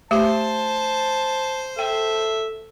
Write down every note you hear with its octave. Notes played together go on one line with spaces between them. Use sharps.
A3 G4 C5 A5
A4 E5 G5